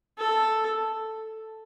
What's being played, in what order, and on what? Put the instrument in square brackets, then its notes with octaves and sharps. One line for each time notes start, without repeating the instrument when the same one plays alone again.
[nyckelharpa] A4